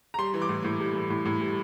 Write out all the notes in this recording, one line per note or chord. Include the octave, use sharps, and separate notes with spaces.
A#5
G3 C6
E3
D6
A2
A2
G3
E3
A2
A2
G3